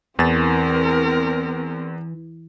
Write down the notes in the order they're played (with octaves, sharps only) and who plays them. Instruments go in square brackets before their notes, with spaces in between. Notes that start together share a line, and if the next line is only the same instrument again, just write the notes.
[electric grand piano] E2 A6 [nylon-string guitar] E3 [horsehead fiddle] C4 A#4